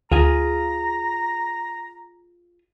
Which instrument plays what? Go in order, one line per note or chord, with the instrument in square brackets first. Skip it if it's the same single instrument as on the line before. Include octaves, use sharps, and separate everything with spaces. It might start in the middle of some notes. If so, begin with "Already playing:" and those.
[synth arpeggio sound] D2 [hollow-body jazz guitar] F4 G#4 [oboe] A#5